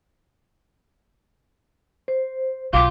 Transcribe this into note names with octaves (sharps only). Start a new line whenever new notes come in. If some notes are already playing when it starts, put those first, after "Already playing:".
C5
B1 F4 D6